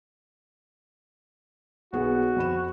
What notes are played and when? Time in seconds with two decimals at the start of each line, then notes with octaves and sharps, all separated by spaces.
1.93 B1 B3 F#4 G#4
2.36 F2 B5 E7